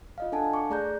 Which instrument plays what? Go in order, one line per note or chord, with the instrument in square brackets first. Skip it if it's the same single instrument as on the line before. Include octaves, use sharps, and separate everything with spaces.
[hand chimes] F4 D#5 F5
D4 A4 F5 F#5 G#5 A5
C#6 D6
A3 G#4 D5 A#5 F#6 G6